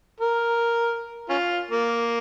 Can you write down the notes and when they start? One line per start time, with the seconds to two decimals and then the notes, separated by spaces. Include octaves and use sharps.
0.20 A#4
1.29 C#4 F4
1.71 A#3